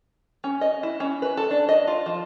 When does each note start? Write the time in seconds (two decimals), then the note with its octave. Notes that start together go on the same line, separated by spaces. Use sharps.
0.44 C#4
0.61 D#5
0.83 E4
1.00 C#4
1.22 B4
1.37 A4
1.51 D4
1.69 D#5
1.87 F4
2.06 F3